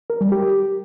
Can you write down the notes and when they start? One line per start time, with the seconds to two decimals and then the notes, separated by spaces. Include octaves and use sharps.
0.10 A#4
0.21 G3
0.32 G4